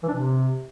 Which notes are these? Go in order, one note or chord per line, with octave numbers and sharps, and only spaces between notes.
E3
D4
C3